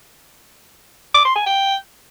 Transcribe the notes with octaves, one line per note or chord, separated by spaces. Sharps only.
D6
C6
G#5
G5